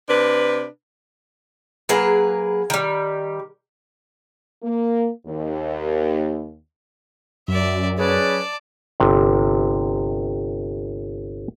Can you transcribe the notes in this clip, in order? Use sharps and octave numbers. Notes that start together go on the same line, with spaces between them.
C3 D4 B4
F#3 A#3 G#4 B4
D#3 G3
A#3
D#2
F#2 F#3 D5 E5
C#4 G#4 B4 D5 A5
G1 C3